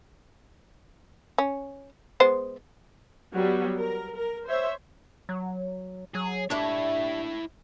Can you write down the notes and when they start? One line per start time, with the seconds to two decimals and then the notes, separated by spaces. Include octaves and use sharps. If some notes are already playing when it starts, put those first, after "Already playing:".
1.38 C#4
2.20 G#3 B3 C5
3.34 F#3 G3 B3
3.78 A#4
4.16 A#4
4.47 C5 C#5 E5
5.29 F#3
6.15 F#3 G#4
6.50 G3 A3 D4 E4 C#5